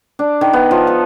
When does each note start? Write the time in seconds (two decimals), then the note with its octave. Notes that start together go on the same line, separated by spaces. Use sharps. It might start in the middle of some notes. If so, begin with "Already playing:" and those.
0.19 D4
0.41 D#3
0.53 B3
0.71 F3
0.87 A4